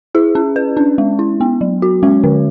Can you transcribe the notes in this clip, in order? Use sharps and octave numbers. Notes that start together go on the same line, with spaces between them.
E4 G#4
C#4
B4
C#4 D4
G#3
E4
B3
F#3
F#4
G#3 C#4
D3